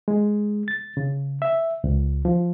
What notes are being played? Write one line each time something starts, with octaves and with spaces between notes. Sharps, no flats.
G#3
A6
C#3
E5
C#2
F3